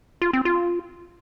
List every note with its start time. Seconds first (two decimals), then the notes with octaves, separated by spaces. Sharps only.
0.22 F4
0.33 C4
0.45 F4